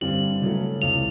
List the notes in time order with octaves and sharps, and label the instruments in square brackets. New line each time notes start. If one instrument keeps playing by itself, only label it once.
[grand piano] G2 D3 G3 C4 [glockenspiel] F#7
[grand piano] C#3 F#3 A3
[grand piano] C#2 C3 E3 [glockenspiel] F7